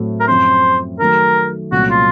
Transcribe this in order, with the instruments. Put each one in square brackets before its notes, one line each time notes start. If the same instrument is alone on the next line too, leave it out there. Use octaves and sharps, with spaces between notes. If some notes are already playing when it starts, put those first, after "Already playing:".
Already playing: [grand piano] A2 F#3 C4 F#4 A4
[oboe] A#4
[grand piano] F#2 F3 C4 [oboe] C5
[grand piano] D#3 F#3 A3 [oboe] A#4
[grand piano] C2 A#2 F#3 A3 C#4 [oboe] F#4
[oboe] F4